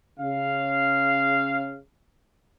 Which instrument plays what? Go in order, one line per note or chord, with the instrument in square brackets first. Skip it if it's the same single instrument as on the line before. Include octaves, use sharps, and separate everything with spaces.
[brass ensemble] C#3 F5